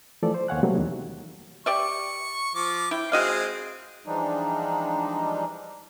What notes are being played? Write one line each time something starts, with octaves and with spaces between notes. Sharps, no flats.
E3 F3 A3 A4 D5
C5
D#2 C#5 F5 F#5 G#5 F#6
C3 F#3 G3 A3 A#3
E2 D#3
G4 D5 E5 C#6
F3 D6
E4 G5
G#3 C4 F#4 G#4 D#5 F5
E3 F3 G3 G#3 D4 D#4